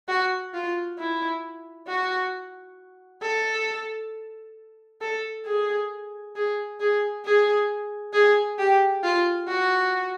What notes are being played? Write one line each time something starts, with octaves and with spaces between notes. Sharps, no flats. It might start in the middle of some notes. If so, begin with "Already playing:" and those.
F#4
F4
E4
F#4
A4
A4
G#4
G#4
G#4
G#4
G#4
G4
F4
F#4